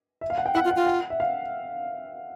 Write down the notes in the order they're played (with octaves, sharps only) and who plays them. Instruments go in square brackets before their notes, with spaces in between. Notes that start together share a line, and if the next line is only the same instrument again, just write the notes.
[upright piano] E5
F5
F#5
G5
[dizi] E4 [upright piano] F#5
[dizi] F4
[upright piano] F#5
[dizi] F4
[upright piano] F#5
E5
F5